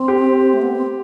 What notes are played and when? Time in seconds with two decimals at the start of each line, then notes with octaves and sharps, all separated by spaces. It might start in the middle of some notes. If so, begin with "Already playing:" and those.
Already playing: C4
0.08 G4
0.53 A3
0.62 B3
0.76 C4